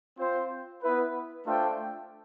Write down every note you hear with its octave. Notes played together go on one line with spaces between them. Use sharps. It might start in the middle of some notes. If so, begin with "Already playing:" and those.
C4 F4 C5
B3 E4 B4
A3 D4 F4 C5 G5